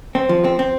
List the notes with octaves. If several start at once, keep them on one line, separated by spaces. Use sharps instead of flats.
C4
F3
C4
C4